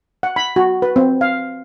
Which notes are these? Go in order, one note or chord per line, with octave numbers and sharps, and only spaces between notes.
F#5
B5
F#4
B4
C4
F5